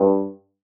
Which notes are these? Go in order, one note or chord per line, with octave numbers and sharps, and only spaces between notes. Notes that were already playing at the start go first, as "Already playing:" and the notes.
Already playing: G2